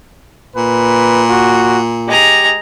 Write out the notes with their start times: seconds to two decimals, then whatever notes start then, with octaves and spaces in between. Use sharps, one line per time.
0.56 A#2 B4
1.30 F#4
2.08 G#3 G4 A#5